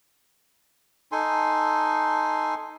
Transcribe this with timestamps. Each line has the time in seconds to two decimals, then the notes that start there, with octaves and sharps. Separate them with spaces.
1.12 D#4 A4 G#5 C6